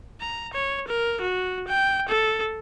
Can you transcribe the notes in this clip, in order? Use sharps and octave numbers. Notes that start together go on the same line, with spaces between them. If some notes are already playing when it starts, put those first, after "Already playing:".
A#5
C#5
A#4
F#4
G5
A4